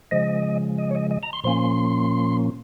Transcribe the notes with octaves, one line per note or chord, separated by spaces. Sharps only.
C#3 F3 G#3 D#5
D#5
C#5
D#5
D#5
A#5
C6
A#2 F3 A#3 C#4 C6